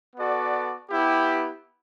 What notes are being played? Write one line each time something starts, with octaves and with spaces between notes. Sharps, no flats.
B3 F#4 A4 D5
B3 E4 G4